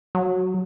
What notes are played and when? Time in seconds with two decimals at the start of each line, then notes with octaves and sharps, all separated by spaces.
0.15 F#3